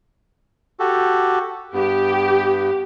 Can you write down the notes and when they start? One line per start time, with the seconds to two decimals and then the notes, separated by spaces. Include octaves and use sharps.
0.80 F#4 G4 A4
1.74 G2 B3 G4